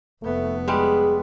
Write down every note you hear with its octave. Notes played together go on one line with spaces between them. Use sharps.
F1 A3 B3
G3 G#3 G#4